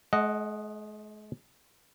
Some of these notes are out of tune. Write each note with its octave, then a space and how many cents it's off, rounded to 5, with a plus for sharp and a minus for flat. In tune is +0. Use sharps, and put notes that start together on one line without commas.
G#3 +45 D#5 +0 F#5 +0